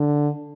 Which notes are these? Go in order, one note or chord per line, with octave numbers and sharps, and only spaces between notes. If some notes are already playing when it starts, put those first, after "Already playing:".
Already playing: D3